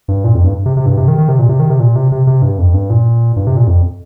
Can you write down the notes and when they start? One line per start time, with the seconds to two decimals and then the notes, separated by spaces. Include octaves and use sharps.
0.08 G2
0.24 A#2
0.35 F2
0.44 G2
0.66 C3
0.77 C3
0.86 G2
0.98 C3
1.08 D#3
1.18 D#3
1.28 C3
1.39 A#2
1.49 C3
1.59 D#3
1.70 C3
1.80 A#2
1.96 C3
2.12 C3
2.27 C3
2.42 G2
2.58 F2
2.74 G2
2.90 A#2
3.36 G2
3.47 C3
3.57 A#2
3.67 F2